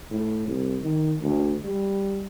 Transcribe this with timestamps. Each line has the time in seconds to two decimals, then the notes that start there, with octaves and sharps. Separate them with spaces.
0.11 A2
0.47 C2
0.82 D#3
1.21 D2
1.64 G3